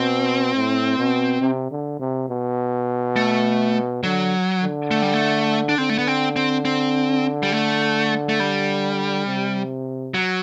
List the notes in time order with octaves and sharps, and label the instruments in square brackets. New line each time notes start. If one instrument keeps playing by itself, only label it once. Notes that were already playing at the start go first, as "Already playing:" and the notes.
Already playing: [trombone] B2 [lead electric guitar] C4
[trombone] A2
B2
C3
D3
C3
B2
[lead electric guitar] A3
[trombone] D3 [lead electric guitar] F#3
[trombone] D3
[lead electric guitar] A3
G3
A3
D4
[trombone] D3 [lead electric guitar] C4
[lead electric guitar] A3
B3
C4
C4
C4
G3
A3
A3
G3
[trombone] C3
[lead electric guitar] F#3